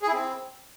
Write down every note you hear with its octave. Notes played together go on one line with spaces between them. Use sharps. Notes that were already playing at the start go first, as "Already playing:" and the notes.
G#4
E4
C4